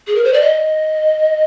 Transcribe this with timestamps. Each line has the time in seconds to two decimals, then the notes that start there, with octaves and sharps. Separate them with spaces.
0.07 G#4
0.15 A#4
0.24 C5
0.33 D5
0.41 D#5